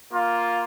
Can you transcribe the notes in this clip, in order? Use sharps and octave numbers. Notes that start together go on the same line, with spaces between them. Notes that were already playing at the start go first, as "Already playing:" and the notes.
A#3 F4